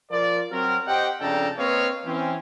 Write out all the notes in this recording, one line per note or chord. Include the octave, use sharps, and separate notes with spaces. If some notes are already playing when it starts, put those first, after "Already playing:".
F3 F4 A#4 D5
F#3 C4 F#4 A#4
G4 C5 D#5 F#5 G5
F2 C#3 D4 A4 G5 A#5
A#3 C4 B4 C#5 D#5 F5
E3 C4 C#4